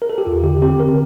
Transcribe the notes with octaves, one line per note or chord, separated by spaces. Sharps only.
A#4
A4
G4
E2 F4
D3 G4
C4 G4
D3 A#4